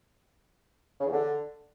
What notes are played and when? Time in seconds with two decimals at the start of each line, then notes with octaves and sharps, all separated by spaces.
1.01 C#3
1.07 E2
1.13 D3